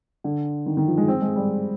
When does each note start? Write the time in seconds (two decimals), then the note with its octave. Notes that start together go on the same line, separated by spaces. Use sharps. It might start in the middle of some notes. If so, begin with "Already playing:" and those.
0.24 D3
0.66 D#3
0.77 D#3
0.88 F3
0.97 G#3
1.08 C4
1.22 G#3
1.36 G3